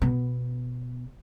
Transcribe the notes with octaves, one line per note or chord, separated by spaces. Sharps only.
B2 B3